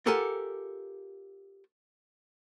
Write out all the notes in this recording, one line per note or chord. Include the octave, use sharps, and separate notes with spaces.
F4 G4 A4 A#4 F#5 G#5